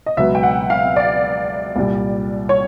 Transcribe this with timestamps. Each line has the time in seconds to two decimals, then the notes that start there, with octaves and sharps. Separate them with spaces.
0.06 D#5
0.17 C#2 B2 F#3 B3 E5
0.35 G5
0.43 F#5
0.70 F5
0.96 D5
1.76 C2 A#2 G3
2.49 C#5